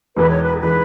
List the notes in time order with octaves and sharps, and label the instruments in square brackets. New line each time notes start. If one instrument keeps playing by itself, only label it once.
[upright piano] E1 E2 E3 G#3 [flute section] B4
[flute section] C#5
B4
G#4
[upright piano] E3 G#3 [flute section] B4